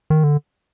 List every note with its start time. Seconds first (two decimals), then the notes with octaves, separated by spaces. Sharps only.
0.10 D#3
0.24 D3